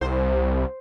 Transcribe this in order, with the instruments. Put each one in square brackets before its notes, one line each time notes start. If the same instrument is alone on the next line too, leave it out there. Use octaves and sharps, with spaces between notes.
[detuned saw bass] C2 [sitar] C5